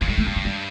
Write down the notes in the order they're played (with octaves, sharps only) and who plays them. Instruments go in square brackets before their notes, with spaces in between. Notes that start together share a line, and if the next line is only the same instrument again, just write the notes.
[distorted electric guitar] A#2 [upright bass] F3
[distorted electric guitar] A2 [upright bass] G3
[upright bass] A3
[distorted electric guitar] G2 [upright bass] G3
[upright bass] F3
G3